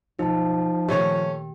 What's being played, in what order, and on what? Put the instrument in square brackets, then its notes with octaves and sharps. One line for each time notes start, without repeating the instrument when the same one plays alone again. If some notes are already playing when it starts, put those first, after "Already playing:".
[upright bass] B1 F4 [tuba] F3 [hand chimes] D#4 A5
[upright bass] A#2 D#3 [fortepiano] A3 C#4 C#5 [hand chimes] G4